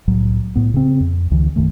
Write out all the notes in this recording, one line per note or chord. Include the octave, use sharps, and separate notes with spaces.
C2 A2 F#3
A2 B3
C#3 C4
F2
C#2 D3 E3
B1 F#2 D#3 A3